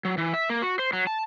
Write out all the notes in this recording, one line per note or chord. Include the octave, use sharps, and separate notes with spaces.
F#3
E3
E5
A#3
F#4
C5
F#3
A5